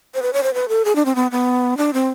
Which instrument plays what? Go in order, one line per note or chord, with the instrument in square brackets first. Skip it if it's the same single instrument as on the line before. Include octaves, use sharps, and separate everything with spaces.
[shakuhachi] C5
B4
C#5
C5
B4
A4
G#4
D4
C4
B3
B3
D4
C4